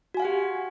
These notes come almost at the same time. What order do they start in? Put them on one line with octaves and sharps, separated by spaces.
F#4 G#5 F5 F#5 G4